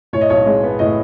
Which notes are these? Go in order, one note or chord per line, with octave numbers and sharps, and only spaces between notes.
A2 C#5
D#5
B1 C#5
G#3
B3
A2 D#5